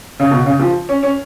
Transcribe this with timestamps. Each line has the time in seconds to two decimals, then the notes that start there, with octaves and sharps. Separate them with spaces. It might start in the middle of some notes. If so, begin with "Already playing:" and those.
0.20 C#3
0.31 B2
0.46 C#3
0.60 F3
0.89 C#4
1.03 C#4